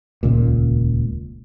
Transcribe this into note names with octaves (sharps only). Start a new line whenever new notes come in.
D#1 C#2 A#2